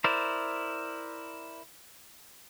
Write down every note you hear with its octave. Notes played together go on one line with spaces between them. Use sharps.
E4 A#4 C5 D5